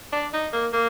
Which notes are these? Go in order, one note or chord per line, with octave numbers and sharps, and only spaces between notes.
D4
D#4
A#3
A#3